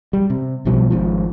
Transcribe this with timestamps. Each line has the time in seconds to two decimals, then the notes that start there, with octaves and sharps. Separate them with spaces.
0.13 G3
0.30 C3
0.65 B1 B2 F3 G3
0.90 G#1 G#2 F3